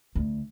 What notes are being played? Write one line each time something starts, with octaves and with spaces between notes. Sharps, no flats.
D2